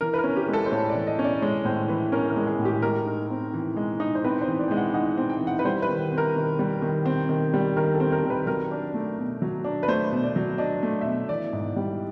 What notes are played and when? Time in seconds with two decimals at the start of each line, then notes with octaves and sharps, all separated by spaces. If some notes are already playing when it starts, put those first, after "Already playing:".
0.01 E3 A#4
0.14 B4
0.18 A#4
0.24 C#4
0.37 G4
0.48 G#3
0.53 A4
0.66 C5
0.71 A2 C#5
0.89 D5
0.95 E3
1.07 D#5
1.19 C#4
1.24 D5
1.42 G#3 C#5
1.65 A2 C5
1.88 E3 B4
2.12 C#4 A#4
2.30 A#4
2.36 G#3
2.47 G#4
2.59 A2
2.65 G4
2.82 G#3 A#4
3.06 D#4
3.30 C4
3.54 E3
3.76 G#3
4.00 D#4
4.15 C5
4.25 C4 B4
4.42 C5
4.47 E3
4.60 D5
4.68 G#3 G5
4.77 F#5
4.94 D#4 F#5
5.17 C4
5.30 G5
5.41 E3
5.47 F#5
5.59 B4
5.65 G3 C5
5.82 B4
5.89 D#3
6.12 C4
6.18 A#4
6.36 D#3
6.59 G3
6.82 D#3
7.06 C4
7.29 D#3
7.54 G3
7.77 D#3 A#4
7.95 A4
8.00 C4
8.12 A#4
8.23 D#3
8.30 B4
8.47 F#3 A#4
8.71 D4
8.94 A3
9.18 B2
9.42 F#3
9.64 D4
9.83 B4
9.88 A3 C5
10.12 B2
10.24 D5
10.36 F#3
10.58 D4 D#5
10.83 A3
11.01 E5
11.05 B2 D#5
11.29 E3 D5
11.53 G#2
11.76 G3